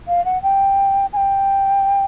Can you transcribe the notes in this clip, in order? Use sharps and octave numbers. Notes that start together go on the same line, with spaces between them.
F5
F#5
G5
G#5
G5